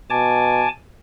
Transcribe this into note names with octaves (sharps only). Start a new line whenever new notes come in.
B2 G#5 A5 D6